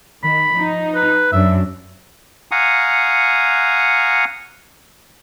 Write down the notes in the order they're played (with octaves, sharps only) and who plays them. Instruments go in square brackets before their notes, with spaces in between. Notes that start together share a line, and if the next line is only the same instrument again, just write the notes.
[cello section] D#3 [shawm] B5
[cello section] F3 D#4
[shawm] B4
[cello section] F#2 F#3 D4 [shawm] E5
[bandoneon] F5 F#5 G#5 A#5 C#6 D#6